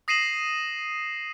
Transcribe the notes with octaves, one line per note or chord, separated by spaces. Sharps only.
D#6 A#6 C7 D#7 E7 F#7